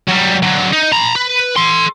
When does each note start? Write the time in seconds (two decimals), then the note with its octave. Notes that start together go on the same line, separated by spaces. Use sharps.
0.08 F#3 G3
0.43 D3 F#3
0.73 D#4
0.92 A#5 B5
1.16 B4
1.57 A4 C6